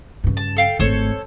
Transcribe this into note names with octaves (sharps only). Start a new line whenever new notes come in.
G2 C#3
A5
A4 F5 G5
G#1 A3 A4 C5 C#5